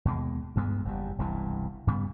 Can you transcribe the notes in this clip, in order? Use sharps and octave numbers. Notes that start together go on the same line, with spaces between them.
D#2 B2 G#3
D2 G2 G#3 B3
F#1 E2 G3
E1 C2 G2 E3
G2 C#3 G3 B3